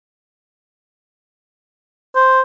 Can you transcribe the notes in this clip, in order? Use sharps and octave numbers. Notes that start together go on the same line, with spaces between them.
C5